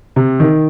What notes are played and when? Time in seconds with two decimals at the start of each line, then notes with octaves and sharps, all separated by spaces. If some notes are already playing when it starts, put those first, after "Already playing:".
0.16 C3
0.40 D#3